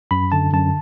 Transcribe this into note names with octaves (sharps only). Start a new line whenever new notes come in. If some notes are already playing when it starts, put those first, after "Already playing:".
F#2 B5
D3 A5
F#2 A5